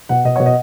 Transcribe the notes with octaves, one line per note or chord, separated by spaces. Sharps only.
B2 F#5
B2 D#5
B2 C#5
D#5